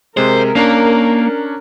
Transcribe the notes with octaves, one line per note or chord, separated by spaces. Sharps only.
C3 G#3 A#4 C5
A#3 C#4 D4 C#5